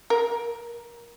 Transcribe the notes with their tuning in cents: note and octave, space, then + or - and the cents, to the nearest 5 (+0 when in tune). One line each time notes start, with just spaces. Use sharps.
A#4 +25